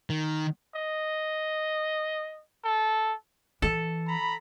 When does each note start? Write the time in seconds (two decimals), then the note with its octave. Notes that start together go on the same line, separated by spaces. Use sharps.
0.10 D#3
0.75 D#5
2.64 A4
3.62 E3 A4
4.07 A#5 B5